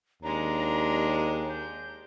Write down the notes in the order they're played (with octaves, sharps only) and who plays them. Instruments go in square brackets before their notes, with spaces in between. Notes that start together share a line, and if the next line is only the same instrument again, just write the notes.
[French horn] D#2 [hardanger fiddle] G#3 D4 [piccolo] A#5
[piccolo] G6